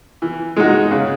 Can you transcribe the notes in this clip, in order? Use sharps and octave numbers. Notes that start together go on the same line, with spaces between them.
E3
G#3 D#4 F#4
C#3